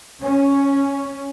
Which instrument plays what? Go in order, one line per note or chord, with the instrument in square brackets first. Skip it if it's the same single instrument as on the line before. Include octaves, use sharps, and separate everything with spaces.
[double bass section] C#4